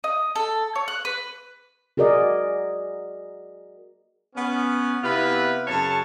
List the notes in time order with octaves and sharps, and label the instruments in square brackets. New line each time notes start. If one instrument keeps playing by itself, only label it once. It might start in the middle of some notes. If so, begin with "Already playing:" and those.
[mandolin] D#5
A4
C#5
F#6
B4
[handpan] F#4 G#4 A#4 D5 D#5
[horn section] B3 C#4
C3 B3 E4 F4 G4 B4
F#2 C#3 G#4 C#5 A5